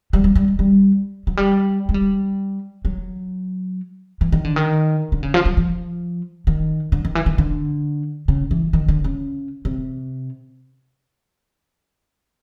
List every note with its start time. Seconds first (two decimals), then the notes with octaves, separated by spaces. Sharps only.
0.13 G3
0.24 G3
0.35 G3
0.48 G#3
0.59 G3
1.27 F#3
1.37 G3
1.89 G#3
1.94 G3
2.85 F#3
4.21 E3
4.32 D#3
4.44 D3
4.56 D#3
5.12 D3
5.23 C#3
5.34 F3
5.45 F#3
5.57 F3
6.47 D#3
6.92 D3
7.05 D#3
7.15 E3
7.26 D#3
7.38 D3
8.28 C#3
8.51 E3
8.73 D#3
8.88 D3
9.04 C#3
9.65 C3